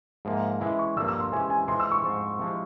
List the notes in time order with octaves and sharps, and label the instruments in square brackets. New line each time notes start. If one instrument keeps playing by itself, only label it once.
[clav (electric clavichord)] G#2 F3 A#3 [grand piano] E5
[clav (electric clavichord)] E3 G#3 C#4 E4 [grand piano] E5
[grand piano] C#6
[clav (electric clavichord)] G2 F3 A#3 [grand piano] E6
[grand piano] E6
C6
[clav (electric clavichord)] C3 E3 G#3 C#4 [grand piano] G#5
[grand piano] G#5
[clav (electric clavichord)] E3 G#3 C4 F4 [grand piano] C6
[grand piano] E6
C#6
[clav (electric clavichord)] G#2 F3 C4 F4
C3 F3 G#3 E4